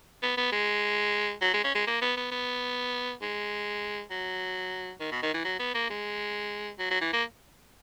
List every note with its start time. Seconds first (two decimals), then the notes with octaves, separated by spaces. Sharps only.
0.23 B3
0.37 B3
0.52 G#3
1.42 F#3
1.54 G#3
1.64 C#4
1.75 G#3
1.87 A#3
2.02 B3
2.17 B3
2.31 B3
3.22 G#3
4.11 F#3
5.00 D#3
5.12 B2
5.23 D#3
5.34 E3
5.45 F#3
5.60 B3
5.74 A#3
5.90 G#3
6.79 F#3
6.91 F#3
7.01 E3
7.13 A#3